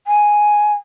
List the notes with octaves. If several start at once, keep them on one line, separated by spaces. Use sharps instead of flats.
G#5